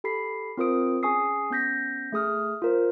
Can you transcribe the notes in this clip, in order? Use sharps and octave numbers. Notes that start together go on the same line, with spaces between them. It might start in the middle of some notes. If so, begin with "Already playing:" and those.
G4 A4 B5 B6 C7
C4 F4 A#4 C5 D#6 D7
C#4 G#4 G#5 C#6 D#6 C7
B3 C#4 G6 A#6 B6
A3 G#4 D#6 F6
F4 A#4 C5